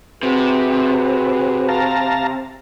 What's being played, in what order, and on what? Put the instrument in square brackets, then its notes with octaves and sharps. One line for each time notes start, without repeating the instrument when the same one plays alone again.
[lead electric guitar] C3 [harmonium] F#4 G#4 B4
[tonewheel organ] F5 A5 A#5